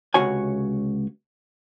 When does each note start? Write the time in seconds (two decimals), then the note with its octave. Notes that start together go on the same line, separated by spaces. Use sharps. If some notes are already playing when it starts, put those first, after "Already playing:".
0.14 C#2 C3 F#4 C#5 G#5